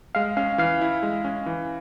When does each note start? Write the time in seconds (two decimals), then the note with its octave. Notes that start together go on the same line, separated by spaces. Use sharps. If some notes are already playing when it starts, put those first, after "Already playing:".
0.15 G#3 F5
0.37 C#4 F5
0.58 E3 F5
0.81 E4
1.03 G#3
1.24 C#4
1.46 E3